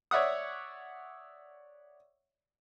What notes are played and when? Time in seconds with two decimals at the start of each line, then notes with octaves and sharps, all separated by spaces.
0.11 C#5 D5 E5 F#5 D#6